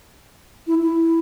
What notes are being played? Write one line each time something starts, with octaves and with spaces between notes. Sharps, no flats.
E4
E4